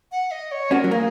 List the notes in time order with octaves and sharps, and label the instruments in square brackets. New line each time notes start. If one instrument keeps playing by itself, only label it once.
[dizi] F#5
D#5
C#5
[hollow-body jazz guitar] C#4 F#4 [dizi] A#4
[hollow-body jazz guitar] F#3
[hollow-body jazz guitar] A#3 [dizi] A#4
[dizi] G#4